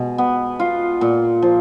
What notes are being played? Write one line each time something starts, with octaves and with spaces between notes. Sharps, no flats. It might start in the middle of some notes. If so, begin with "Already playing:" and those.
Already playing: B2 G#3
B3
F4
A#2
F3